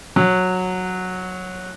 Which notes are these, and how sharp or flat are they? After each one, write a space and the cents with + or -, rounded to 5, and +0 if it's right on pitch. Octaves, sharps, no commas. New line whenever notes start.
F#3 -10